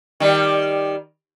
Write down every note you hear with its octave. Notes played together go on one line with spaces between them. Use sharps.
D#3 G3